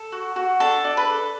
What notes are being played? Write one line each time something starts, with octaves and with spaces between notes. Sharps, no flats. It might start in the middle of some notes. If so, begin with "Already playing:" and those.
Already playing: A4
F#4
F#4
D4 A4
D4
B4
A4